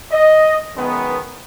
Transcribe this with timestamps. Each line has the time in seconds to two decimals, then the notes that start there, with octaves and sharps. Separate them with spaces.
0.12 D#5
0.74 F#2 D#3 G#3 B3